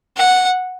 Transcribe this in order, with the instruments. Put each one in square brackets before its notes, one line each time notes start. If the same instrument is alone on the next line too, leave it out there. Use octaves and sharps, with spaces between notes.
[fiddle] F#5